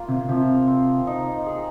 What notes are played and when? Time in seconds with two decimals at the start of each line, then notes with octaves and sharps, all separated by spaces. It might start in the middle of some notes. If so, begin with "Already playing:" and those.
Already playing: A#3 F4
0.09 C3
0.29 C3 F3
0.68 C4
1.07 D#4
1.46 G#4